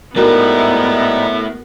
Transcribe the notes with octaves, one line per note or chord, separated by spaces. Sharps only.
G#2 G3 A3 B3 D#4 E4 F#4 A#4